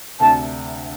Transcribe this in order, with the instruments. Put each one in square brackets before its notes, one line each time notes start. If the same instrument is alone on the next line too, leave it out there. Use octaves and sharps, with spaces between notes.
[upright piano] D2 C3 A3 D4 A4 [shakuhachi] A5